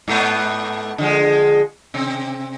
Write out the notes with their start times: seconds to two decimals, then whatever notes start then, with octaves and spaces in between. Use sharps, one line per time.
0.08 G#2 A3 B3
0.98 D3 F3 G#3
1.94 C3 C4